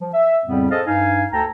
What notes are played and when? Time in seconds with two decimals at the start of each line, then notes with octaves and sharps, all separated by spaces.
0.01 F3
0.14 E5
0.45 F2 A2 C#3 G3 B3 C4
0.71 G#4 A4 C5 D#5 F5 A5
0.87 G2 D#4 F5 G#5
1.32 D2 A4 G5 A5 A#5